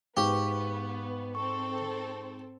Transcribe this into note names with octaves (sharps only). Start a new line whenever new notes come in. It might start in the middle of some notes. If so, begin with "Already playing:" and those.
G#2 B3 G4 F5 C#6
C4 A4 C#6